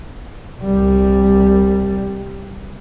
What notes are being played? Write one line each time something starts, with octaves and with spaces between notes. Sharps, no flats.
C2 G3